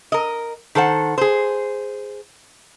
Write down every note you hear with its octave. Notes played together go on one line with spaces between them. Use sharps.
A#4 D#5
D#3 A4 C5 F#5
G#4 C5